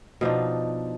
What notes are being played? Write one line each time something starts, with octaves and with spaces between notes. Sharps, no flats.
B2 F3 D4 D#4